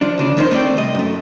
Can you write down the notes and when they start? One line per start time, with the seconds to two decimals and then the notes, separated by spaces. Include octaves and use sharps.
0.01 F3 D4
0.18 D2 C#3 D4
0.37 F2 A2 D#3 F3 D#4 C5
0.51 A3 C4 D5 G5
0.77 C2 D#5
0.95 F#2 A3